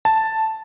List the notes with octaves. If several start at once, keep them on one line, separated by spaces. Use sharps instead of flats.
A5